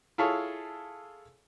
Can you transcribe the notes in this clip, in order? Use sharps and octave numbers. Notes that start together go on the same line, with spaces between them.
E4 F4 G#4 A4 C#5